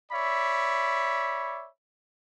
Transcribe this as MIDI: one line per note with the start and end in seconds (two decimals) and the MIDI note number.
0.12 1.67 73
0.12 1.67 74
0.12 1.67 76
0.12 1.67 83